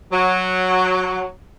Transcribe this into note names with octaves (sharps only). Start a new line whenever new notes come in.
F#3